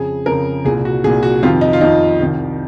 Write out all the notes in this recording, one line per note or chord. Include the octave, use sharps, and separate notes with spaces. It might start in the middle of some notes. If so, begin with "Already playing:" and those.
Already playing: F2 C#3 G#4
F2 C#3 A#4
C2 A#2 G#4
F#4
C2 A#2 G#4
F#4
F2 C3 D#3 F4
D#4
F4
F2 C3 D#3 D#4
C2 C3 D#3